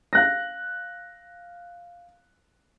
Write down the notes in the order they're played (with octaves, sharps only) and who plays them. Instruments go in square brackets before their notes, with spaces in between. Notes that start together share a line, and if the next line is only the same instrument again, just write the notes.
[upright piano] F5 F#6 A#6